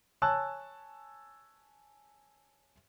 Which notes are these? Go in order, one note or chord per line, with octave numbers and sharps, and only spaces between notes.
C#5 G#5 A5 E6 F#6